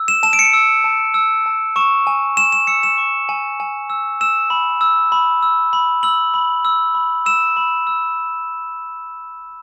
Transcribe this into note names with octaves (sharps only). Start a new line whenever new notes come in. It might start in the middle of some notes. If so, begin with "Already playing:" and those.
Already playing: E6
E7
A5 E7
D7
C#7
E6
A5
E6
A5
C#6 E7
G#5
G#5 E7
E7
E6 C#7
E7
C#6
G#5
G#5
E6
E6 E7
B5
E6
B5
E6
B5
E6 F#7
B5
E6
B5
E6 E7
B5
E6